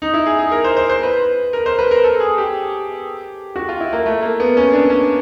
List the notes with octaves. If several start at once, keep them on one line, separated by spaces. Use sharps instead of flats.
D#4
E4
G#4
G#4
A#4
C5
C5
C5
B4
A#4
C5
B4
A#4
A4
G#4
G4
F#4
F4
E4
A#3
A3
A#3
B3
C#4
D4
C#4